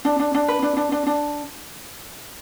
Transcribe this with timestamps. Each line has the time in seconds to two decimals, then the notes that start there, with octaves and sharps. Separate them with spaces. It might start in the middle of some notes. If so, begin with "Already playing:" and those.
0.05 D4
0.19 D4
0.35 D4
0.48 B4
0.63 D4
0.77 D4
0.92 D4
1.06 D4